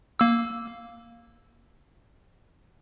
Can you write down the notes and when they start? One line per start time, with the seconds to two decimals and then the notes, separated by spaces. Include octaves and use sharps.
0.20 A#3 E6